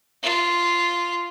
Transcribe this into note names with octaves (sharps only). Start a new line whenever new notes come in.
F4